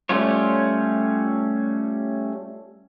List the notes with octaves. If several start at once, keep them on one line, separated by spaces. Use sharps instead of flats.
G3 A3 C#4 F4 C#5